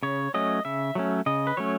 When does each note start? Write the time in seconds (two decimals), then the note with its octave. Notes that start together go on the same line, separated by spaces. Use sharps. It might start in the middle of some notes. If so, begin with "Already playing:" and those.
0.03 C#3 C#5
0.34 F#3 A3 C#4 D#5
0.65 C#3 E5
0.95 F#3 A3 C#4
1.26 C#3 D#5
1.47 B4
1.57 F#3 A3 C#4 C#5